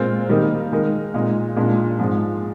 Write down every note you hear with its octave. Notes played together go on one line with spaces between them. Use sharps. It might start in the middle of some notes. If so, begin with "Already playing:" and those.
Already playing: A#2 G#3 C4 F4 A#4
D#3 G3 A#3 D#4 A#4
D#3 G#3 D#4 A#4
A#2 G#3 D#4
A#2 G#3 D4
G#2 F3 G#3